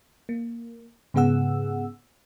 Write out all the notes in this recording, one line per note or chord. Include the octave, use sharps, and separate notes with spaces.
A#3
G#2 C#3 B3 G#4 F#5 E6